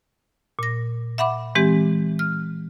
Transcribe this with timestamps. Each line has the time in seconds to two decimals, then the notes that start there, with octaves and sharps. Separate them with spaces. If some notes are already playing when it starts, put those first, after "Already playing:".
0.59 A#2 A#6
1.18 E5 F#5 B5 D6
1.55 E3 G#3 C4 G4
2.19 F6